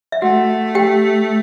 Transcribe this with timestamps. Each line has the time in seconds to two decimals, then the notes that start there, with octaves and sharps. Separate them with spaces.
0.12 E5
0.22 A3 F#4 F#5
0.75 G4 G5